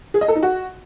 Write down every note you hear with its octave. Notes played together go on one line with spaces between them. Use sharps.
G#4
D#5
A4
D#4
F#4